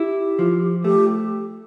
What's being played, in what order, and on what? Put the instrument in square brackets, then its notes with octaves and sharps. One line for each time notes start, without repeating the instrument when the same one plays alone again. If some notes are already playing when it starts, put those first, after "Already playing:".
Already playing: [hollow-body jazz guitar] E4 [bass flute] G4
[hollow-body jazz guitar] F3
[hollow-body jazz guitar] A3 [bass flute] G4